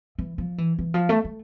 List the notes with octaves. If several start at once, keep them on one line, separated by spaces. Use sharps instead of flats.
E3
F3
E3
E3
F3
A3
A3